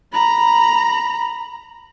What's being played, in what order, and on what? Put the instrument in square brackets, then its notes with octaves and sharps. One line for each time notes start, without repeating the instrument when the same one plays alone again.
[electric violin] A#5 B5